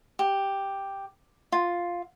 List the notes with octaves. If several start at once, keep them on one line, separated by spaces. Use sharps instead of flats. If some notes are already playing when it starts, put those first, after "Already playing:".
G4
F4